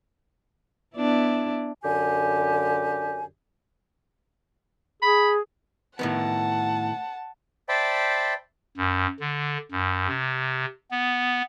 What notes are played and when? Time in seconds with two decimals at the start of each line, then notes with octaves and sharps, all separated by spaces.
0.96 B3 D4 E4
1.84 F#2 D3 G4 G#5
5.03 G#4 B5
5.99 A2 D#3 B3 F#5 A5
7.69 C5 D5 E5 G5 A5 B5
8.77 F#2
9.20 D3
9.71 F#2
10.08 C3
10.91 B3